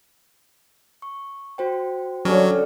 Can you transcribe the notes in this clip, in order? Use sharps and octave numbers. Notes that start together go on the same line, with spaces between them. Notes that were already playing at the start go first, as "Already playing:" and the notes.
C#6
F#4 C5 G5
D3 F#3 G3 C#4